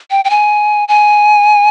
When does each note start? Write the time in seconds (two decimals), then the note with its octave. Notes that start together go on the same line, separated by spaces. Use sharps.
0.11 G5
0.25 G5
0.30 G#5
0.88 G#5